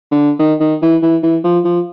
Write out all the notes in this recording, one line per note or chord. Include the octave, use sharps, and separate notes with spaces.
D3
D#3
D#3
E3
E3
E3
F3
F3